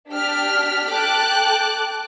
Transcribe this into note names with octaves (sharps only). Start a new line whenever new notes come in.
D4 G4 F6 B6
A4 G5 A5 D6 F#6